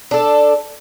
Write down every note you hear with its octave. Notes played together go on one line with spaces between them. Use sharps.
D4 A4